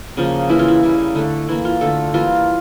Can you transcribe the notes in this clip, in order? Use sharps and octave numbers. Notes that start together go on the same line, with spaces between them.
C#3 F3 A#3
E3 A#3 E4
F4
E4
C#3 G3 A#3
D3 A3
E3 A#3 E4
F4
D3 A3 A4
E3 G3 A#3 F4